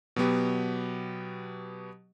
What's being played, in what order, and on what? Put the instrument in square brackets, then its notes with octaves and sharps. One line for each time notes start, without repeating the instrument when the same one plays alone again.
[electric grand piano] B2 F#3 B3 G4